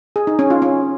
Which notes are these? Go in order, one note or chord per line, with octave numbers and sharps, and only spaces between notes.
G#4
D#4
C#4
F4
C#4